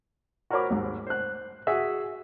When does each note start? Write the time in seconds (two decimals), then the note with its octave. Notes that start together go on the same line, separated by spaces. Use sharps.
0.50 F#4 A#4 C5 C#5 B5 D6
0.71 D#2 G#2
1.07 C5 F#6
1.67 F#4 G#4 E5